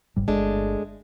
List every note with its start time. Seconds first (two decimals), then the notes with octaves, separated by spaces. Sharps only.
0.16 G1 G#2 G3
0.28 G1 G#3 A3 D4